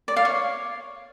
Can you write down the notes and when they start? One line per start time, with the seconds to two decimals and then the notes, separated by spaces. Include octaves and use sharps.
0.08 D5
0.16 F5
0.25 C#5